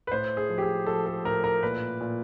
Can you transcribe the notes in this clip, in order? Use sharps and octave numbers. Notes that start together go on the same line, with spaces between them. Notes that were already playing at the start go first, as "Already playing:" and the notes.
B4
A2 C5
G#4
F3
G4
G#4
F3 A4
A4
A2 A#4
A#4
A#2 B4
A#2